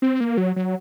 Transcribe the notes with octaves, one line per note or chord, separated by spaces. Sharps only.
C4
A#3
F#3
F#3